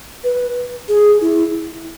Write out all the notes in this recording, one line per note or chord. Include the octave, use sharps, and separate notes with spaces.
B4
G#4
E4